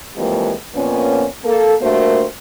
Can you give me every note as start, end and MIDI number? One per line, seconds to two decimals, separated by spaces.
0.16 0.52 41
0.16 0.52 52
0.16 0.52 55
0.16 0.52 56
0.16 0.52 58
0.74 1.25 41
0.74 1.25 46
0.74 1.25 58
0.74 1.25 59
0.74 1.25 61
1.44 1.73 58
1.44 1.73 69
1.82 2.24 43
1.82 2.24 57
1.82 2.24 58
1.82 2.24 66
1.82 2.24 70
1.82 2.24 72